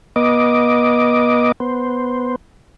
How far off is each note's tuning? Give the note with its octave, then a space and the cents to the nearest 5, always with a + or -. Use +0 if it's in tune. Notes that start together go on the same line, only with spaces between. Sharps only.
B3 -35 D#5 +0 D6 +0
B3 +0 C5 +0